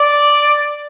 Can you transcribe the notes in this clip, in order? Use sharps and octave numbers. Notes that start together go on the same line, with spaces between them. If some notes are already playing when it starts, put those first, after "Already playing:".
Already playing: D5